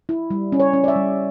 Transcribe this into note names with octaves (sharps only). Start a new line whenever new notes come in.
E4
G3
C#4
C#5
C#4
D5
E5
G3